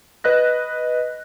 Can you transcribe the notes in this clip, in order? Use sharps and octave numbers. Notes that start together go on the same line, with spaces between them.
B4 D#5 F#6 A#6